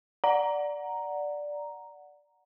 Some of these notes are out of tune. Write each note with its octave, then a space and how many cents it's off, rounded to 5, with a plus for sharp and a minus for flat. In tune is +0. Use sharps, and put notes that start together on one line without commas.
D5 +0 F#5 -5 A#5 +0